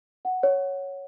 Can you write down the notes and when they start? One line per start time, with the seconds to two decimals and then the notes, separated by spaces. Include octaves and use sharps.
0.25 F#5
0.43 C#5